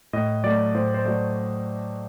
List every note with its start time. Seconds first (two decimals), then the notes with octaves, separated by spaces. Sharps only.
0.13 A2 D#5
0.44 F#3 A3 D5
0.74 A2 C5
0.94 C5
1.04 F#3 A3 D5